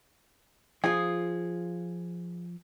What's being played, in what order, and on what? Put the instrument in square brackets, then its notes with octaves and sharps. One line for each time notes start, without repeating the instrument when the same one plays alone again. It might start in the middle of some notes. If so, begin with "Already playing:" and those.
[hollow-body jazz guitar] F3 F4 [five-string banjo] G#4